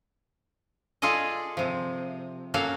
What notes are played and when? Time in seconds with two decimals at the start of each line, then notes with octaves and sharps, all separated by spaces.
1.02 F4 G#4 A4 D5 D#5
1.57 C3 F3
2.54 F#3 A#3 C#4 F#4 A4 F5